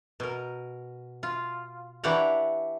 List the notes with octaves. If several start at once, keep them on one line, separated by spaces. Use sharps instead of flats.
B2 A#4
F4
E3 D4 G4 C#5 F#5 A#5